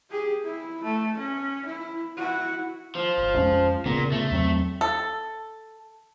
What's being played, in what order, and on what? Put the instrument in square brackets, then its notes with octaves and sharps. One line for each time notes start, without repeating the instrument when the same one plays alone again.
[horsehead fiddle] G4 G#4
E4
A3
C#4
E4
E4 F#4
[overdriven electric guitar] F3
[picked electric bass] G1
F2 G#3 C#4
[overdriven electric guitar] A#2 [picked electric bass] C#3 B3
[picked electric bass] C#3 [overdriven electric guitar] A3
[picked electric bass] E2 F#3 C4
[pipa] A4